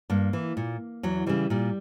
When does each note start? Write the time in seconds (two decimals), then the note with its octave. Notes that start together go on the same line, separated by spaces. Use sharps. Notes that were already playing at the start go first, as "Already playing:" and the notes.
0.10 G2 A#3
0.33 E3
0.57 A#2
1.03 E2 F#3
1.26 C#3 E3 G3
1.50 A#2 G3